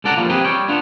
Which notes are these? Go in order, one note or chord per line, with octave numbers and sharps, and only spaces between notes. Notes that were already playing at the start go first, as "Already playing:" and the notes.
C#2 D3 A4 D5 F#5 A#5
F3 G3 A#3 F4
C4 G4 G#4 A#4 B4
G3 C#5 G5
B3 D4 F4